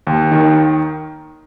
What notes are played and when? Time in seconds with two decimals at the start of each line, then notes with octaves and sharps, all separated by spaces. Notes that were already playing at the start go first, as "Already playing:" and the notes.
0.07 D#2
0.31 D#3